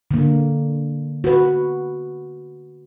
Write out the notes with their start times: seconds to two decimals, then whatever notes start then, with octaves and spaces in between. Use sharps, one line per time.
0.11 D3 A#3
1.24 F#4 B4